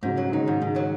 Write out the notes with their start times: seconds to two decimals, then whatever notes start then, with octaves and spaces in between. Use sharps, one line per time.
0.03 G#2 C#3 F#3
0.17 F#3
0.32 D#3 G#3 D#4
0.48 G#2
0.62 G#2 D#3 G#3
0.76 F#3